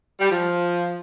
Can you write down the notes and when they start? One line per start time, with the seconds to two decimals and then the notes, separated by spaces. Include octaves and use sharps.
0.20 G3
0.31 F3